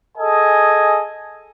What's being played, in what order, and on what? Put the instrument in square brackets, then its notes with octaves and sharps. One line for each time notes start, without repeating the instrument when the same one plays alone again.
[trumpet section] G#4 A4 D#5 G#5